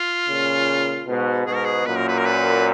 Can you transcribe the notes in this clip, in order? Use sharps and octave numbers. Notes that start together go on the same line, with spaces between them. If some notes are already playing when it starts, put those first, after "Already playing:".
Already playing: F4
A#2 C#3
G#2 B2
G#2 B2 G#4
A#4
G#4
F#2 A#2 B4
A#4
B4
A#4
B4